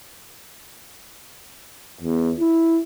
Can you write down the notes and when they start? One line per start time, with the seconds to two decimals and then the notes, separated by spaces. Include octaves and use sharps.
2.01 E2
2.40 E4